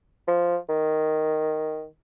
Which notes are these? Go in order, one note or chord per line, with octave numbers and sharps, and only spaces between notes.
F3
D#3